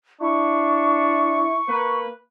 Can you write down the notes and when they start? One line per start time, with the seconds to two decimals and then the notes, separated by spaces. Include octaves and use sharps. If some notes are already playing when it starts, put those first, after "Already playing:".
0.21 D4 E4 C#6
1.68 A#3 B4